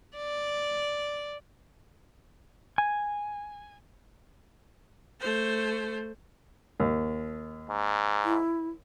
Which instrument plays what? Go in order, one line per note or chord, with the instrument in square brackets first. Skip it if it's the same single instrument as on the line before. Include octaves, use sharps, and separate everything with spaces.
[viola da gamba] D5
[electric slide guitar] G#5
[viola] A3 C5
[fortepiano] D#2
[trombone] G#2
[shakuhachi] E4